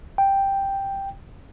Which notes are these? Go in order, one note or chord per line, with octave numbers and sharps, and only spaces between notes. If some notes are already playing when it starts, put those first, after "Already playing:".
G5